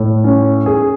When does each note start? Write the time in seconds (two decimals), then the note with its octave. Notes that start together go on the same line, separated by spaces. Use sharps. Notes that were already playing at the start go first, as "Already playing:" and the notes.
Already playing: A2
0.24 C#4
0.66 G#4